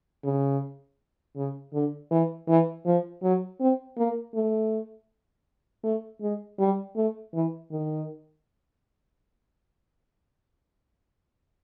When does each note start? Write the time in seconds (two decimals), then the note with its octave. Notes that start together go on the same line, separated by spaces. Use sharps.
0.24 C#3
1.36 C#3
1.73 D3
2.11 E3
2.48 E3
2.86 F3
3.23 F#3
3.60 C4
3.97 A#3
4.35 A3
5.84 A3
6.21 G#3
6.59 G3
6.96 A3
7.34 E3
7.71 D#3